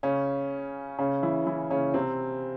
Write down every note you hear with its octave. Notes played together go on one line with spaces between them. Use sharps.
C#3 C#4
C#3 C#4
E3 E4
E3 E4
C#3 C#4
C3 C4